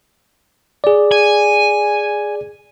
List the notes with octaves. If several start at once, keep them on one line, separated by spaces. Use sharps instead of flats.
G#4 D5
G#5